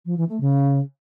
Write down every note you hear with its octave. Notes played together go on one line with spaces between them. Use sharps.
F3
E3
A3
C#3